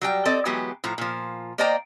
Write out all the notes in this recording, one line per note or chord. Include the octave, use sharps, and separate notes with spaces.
F#3 G3 G5
C4 A4 D5 D#5
E3 F#3 G#3 B3 G4
A2 F3 A#5
A#2 F3
A#3 C5 D5 D#5 G5 A#5